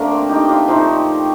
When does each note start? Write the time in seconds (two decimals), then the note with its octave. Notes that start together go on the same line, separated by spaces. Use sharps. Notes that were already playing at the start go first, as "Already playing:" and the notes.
Already playing: D3 F3 A3 A#3 D4
0.11 C4
0.29 D#4 G4
0.48 D4 F4
0.68 A#2 F3 A3 C4 D#4